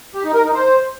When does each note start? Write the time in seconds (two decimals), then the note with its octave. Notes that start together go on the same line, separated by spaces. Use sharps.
0.14 G4
0.24 D#4
0.34 A#4
0.44 D#4
0.54 C5